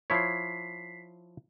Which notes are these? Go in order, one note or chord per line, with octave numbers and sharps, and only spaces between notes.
F3 E4 C#5 B6 C7